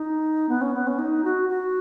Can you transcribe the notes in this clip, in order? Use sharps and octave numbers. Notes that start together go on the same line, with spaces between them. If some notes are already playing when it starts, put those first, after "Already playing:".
Already playing: D#4
B3
C#4
B3
C#4
D#4
F#4
F#4